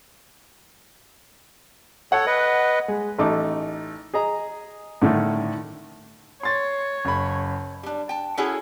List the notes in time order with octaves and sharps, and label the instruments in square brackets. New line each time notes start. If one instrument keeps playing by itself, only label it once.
[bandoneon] A4 C#5 [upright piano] F#5
[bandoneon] B4 D#5
[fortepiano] G#3
A1 A3 D#4 D6
G#4 D#5 A#5
A2 D3 D#3 A3
[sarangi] C#5 [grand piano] C6 A6
[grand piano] F#1 B5
[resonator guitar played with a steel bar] G3 D4
G5 A5
C#4 E4 F#4 G#4 A4 C#5